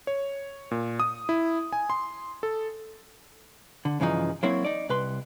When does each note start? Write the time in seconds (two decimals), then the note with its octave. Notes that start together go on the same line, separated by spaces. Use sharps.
0.07 C#5
0.71 A#2
1.00 D#6
1.29 E4
1.73 G#5
1.90 C6
2.43 A4
3.85 D3
4.00 G2 C#3 E3 F3 D#4
4.43 F#3 A#3 C4 E4 F#4 C#5
4.65 D#4 D5
4.89 C2 B4 C6